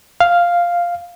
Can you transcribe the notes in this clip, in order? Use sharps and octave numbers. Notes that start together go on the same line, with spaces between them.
F5